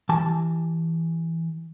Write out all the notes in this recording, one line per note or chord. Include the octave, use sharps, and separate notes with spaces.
E3 G4 A5